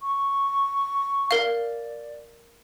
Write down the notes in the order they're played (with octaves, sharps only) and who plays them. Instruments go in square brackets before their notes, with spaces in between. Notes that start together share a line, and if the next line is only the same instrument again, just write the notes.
[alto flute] C#6
[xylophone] A#4 F5 [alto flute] D5